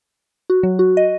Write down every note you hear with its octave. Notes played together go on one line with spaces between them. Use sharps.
F#4
F#3
F#4
D#5